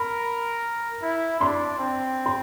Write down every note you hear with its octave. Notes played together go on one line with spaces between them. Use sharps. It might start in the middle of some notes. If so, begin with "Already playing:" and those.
Already playing: A#4 B5
E4
D4 C6
C4
C6